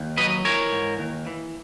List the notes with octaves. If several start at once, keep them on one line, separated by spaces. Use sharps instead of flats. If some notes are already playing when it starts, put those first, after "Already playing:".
Already playing: D#2
F#3 B4 D#5
E3 A#4 C#5
G#2
D#2
E3